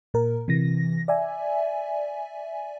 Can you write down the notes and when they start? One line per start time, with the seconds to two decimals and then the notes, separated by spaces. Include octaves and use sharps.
0.14 A#2 A#4
0.48 C3 E3 A#6
1.08 D5 E5 G#5